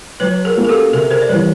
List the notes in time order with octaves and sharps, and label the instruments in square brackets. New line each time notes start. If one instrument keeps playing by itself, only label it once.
[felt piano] F#3 [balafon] B4 C#5
[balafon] G#4 A#4
[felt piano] A#3 C#4 F#4
[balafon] A#4
G4 A4
[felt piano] C3 [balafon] G#4 A#4
[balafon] A#4 C5
D5
[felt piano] E3 G3 [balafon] B4 C#5